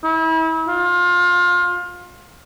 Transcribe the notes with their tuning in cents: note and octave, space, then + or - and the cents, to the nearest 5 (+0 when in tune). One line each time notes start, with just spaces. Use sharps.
E4 -35
F4 +25